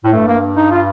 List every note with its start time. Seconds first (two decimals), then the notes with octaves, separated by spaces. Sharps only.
0.04 A2
0.12 G2 A3
0.27 A#3
0.57 D#4
0.71 F4